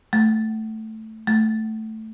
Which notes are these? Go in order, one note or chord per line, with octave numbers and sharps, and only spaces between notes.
A3
A3